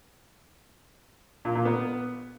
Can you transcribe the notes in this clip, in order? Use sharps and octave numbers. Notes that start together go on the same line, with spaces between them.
A#2
A#2
B3